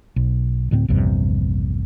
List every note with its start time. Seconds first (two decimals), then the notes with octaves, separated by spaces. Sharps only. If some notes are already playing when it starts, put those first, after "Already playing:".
0.16 B1
0.71 D2 A2 A#3 C4
0.88 A#1 E2 G2 C3